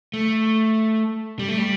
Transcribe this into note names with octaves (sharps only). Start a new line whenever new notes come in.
A3
G3
A3
G3